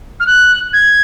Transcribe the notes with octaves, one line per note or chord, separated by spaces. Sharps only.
F6
F#6
G#6